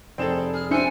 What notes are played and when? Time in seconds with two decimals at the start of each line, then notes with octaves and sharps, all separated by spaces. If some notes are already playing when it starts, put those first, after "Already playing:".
0.18 F1 C4 G#4 A4 E7
0.54 G#4 F6
0.71 C4 D4 C5 E5 G#5 C#7